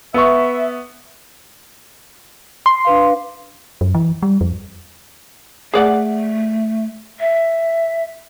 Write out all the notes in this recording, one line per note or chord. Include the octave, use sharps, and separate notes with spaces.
B3 E5 C#6
C6
D4 B4 F5
F#2
E3
G3
F2
A3 G#4 D5 F#5
E5